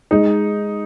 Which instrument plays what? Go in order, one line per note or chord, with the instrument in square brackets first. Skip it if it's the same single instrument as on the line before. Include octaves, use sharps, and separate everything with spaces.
[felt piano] G#3 [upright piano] D#4